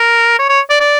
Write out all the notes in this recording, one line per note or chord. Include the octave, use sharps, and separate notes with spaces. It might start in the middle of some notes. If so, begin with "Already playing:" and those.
Already playing: A#4
C#5
C#5
D5
D5